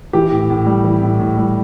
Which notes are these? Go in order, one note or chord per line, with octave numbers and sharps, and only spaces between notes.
E3 G4
A2
A2
G3
E3 E4
A2
A2
G3